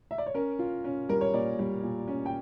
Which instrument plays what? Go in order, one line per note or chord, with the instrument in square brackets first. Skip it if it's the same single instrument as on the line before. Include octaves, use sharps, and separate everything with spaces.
[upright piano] E5
D5
C#5
C#4 A#4
F4
C#4
G3 A#4
C#5
A#2 D5
G3
A#2
C#4
G5